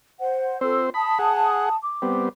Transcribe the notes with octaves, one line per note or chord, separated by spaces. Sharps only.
C5 F#5
C4 F4 A4 C5 E6
A5 B5 D#6
G#4 F#5
D6
G3 B3 C4